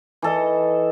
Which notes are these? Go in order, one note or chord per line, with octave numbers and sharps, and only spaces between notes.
E3 A4 D#5